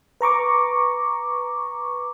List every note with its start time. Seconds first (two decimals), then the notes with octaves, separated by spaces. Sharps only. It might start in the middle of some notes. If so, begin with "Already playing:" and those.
0.21 B4 A#5 C#6 D6